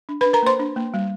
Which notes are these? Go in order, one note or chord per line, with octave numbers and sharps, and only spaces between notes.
D4
D4 B4 B5
A#4 A#5
A#3 C5 C6
D4
A#3
G3